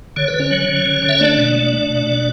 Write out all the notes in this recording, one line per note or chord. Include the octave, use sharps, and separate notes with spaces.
D3 C#5
B4
D3
C#4 C#5
F#3
D3
D3
D3
E5
A3 D4 D5
B2
A3
A3
B2
B2